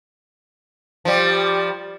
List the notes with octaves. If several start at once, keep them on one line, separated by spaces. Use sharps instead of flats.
F3 G3